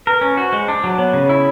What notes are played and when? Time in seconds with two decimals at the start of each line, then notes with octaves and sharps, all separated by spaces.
0.06 A#4 B4
0.21 C#4
0.37 F#4 C5
0.53 G#3
0.68 D4
0.84 F#3
0.98 B3 C#5
1.13 C#3
1.29 E4